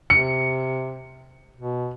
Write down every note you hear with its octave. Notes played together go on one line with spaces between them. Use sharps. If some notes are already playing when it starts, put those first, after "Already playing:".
C3 C#7
B2